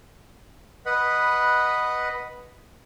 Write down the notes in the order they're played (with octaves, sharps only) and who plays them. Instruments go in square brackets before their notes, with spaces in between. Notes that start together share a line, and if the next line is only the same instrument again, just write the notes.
[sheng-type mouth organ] B4 D#5 F#5 B5